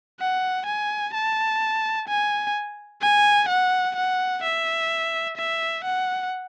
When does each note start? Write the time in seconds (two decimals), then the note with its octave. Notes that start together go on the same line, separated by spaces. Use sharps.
0.20 F#5
0.66 G#5
1.14 A5
2.08 G#5
3.01 G#5
3.49 F#5
3.96 F#5
4.43 E5
5.37 E5
5.84 F#5